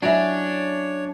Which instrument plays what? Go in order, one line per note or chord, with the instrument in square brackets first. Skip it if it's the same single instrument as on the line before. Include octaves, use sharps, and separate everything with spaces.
[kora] F#3 C#4 E4 [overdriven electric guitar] D4 [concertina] C#5